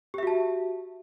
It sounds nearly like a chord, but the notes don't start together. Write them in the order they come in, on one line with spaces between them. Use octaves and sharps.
G4 E5 F#4 A5